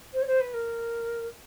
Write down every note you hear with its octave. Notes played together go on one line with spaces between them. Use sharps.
C5
C#5
C5
B4
A#4